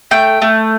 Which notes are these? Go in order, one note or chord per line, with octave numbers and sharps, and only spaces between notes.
A3 G5
A3